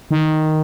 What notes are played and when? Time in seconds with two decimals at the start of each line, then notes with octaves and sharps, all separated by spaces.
0.11 D#3